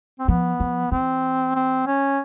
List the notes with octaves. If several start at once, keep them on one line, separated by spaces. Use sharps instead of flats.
C4
F3 B3
F3
E3 C4
C4
C#4